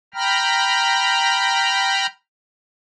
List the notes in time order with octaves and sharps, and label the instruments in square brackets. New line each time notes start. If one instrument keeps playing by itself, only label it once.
[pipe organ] G5 A#5 B5 F6